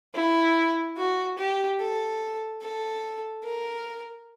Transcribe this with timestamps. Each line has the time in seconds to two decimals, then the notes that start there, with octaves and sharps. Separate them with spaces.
0.14 E4
0.97 F#4
1.38 G4
1.80 A4
2.62 A4
3.44 A#4